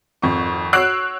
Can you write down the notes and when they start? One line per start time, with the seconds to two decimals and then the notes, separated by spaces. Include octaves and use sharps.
0.22 G#1 F2 C#6
0.73 F#4 C#5 E6 F#6 C7 D7